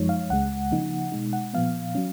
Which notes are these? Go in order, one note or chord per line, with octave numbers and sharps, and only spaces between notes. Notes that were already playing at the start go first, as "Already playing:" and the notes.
Already playing: F#2 F3 G#3 D#4 C#5
F5
C#2 C#3 G#3 F#5
C#3 F3 A#3 D#4
B2 G#3 D#4
F#5
A#2 F3 B3 F5
F#3 C#4